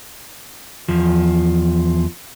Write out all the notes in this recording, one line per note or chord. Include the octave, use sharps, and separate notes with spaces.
E2 F3